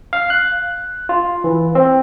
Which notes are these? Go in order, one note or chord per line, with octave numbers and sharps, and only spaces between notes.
F5
F#6
F4
E3
C4